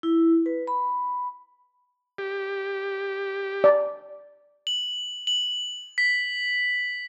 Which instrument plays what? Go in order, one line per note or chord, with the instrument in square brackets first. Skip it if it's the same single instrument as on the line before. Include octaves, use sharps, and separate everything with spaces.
[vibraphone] E4
B4
B5
[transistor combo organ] G4
[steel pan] D5
[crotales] F#7
F#7
B6